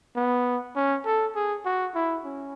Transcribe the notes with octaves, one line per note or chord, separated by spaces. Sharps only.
B3
C#4
A4
G#4
F#4
E4
C#4